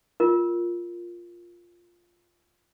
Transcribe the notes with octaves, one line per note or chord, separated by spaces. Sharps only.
F4 A#4